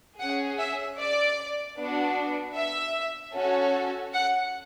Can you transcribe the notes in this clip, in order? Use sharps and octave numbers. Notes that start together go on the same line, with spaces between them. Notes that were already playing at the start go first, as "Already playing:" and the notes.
C#4 G#4 F#5
E5
D5
B3 D4 F#4
E5
C#4 F#4 A4
F#5